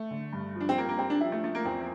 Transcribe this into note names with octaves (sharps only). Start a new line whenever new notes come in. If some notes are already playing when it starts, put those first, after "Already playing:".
Already playing: A3
D3
G2
F3 D4
C4
G3 A#3
A#3
G3 C4
D4
F3 E4
A3
F3 A3
A#3
E2 C4